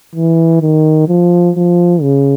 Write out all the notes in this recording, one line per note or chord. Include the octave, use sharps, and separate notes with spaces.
E3
D#3
F3
F3
C#3